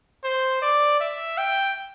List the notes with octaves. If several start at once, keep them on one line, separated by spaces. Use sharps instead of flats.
C5
D5
E5
G5